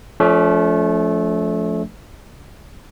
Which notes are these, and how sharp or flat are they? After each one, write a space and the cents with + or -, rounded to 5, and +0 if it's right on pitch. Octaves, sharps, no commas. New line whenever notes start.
F3 +0 A3 -20 C#4 +40